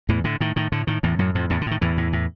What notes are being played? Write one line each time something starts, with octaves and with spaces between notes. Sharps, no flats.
E2 A2 E3
A2 D3
A2 D#3
A2 D#3
A2 D3
A2 D#3
E2 A2 E3
F#2 A2 F#3
F2 A2 F3
E2 A2 E3
D3
A2 D#3
E2 A2 E3
A2
A2